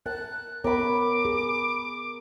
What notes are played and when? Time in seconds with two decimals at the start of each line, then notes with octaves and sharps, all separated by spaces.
0.06 A#4 A5 F#6
0.64 B3 A#4 C#5 B5 D6
1.25 G#4